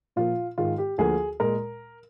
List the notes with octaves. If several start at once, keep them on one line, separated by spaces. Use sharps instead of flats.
A#2 F3 A#3 F4
G#2 D#3 G#3 F4
G4
D2 D3 F3 A#3 G#4
A#2 G#3 A#4